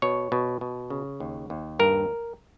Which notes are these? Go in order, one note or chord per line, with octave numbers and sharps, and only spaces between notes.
B2 C#5
B2
B2
C#3
D#2
D#2
G2 A#4